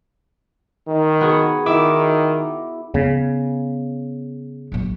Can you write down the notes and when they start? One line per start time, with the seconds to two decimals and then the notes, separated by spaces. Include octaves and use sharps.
0.87 D#3
1.21 B3 F#4 G#4
1.66 D#3 E4 E5 D6
2.94 C#3 B3 C#4
4.72 A#1 F#3